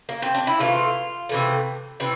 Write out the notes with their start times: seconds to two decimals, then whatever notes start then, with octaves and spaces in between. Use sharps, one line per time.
0.09 A#3
0.22 C4
0.35 D4
0.47 E4
0.59 C3 E3 A3 F4
1.29 C3 E3 A3
2.00 C3 E3